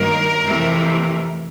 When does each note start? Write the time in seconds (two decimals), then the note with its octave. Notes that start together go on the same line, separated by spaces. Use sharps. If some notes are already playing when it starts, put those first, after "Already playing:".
Already playing: G2 D#3 F#3 A#3 A#4
0.43 F2 C3 E3 A3